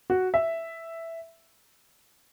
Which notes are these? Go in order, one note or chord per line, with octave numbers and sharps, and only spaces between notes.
F#4
E5